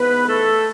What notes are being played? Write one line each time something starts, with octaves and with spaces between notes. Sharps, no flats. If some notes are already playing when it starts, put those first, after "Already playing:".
Already playing: G#2 E3 B3 B4
A3 A4